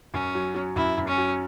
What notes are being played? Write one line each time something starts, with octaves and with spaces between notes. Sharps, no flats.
F#2 C#4
F#3
F#3
F#2 E4
F#2
C#4
F#3